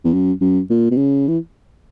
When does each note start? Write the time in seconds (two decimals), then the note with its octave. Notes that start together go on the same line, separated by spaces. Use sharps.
0.04 E2
0.13 F#2
0.41 F#2
0.70 A#2
0.91 B2
0.97 C#3
1.28 E3